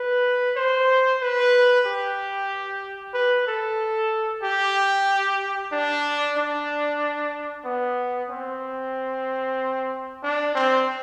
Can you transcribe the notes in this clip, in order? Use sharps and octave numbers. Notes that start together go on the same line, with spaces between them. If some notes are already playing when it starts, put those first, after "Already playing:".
Already playing: B4
C5
B4
G4
B4
A4
G4
D4
D4
B3
C4
D4
C4